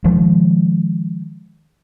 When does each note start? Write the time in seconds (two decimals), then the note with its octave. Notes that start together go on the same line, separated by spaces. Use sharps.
0.04 D#3 F3 G#3